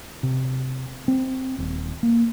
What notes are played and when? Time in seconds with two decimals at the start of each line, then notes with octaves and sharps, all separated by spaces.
0.23 C3
1.08 C4
1.58 D#1
2.03 A#3